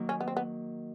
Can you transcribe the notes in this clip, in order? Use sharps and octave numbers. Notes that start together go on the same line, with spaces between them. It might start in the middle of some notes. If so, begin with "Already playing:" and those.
Already playing: D#3 F#3 A#3
C#4
B3
C4
B3